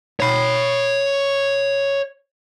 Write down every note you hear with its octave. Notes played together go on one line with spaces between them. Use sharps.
C#5 B5